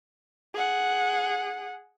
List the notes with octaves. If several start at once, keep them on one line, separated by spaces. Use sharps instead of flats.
G#4 F#5